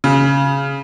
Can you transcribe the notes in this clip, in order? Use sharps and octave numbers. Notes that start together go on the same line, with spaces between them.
C#3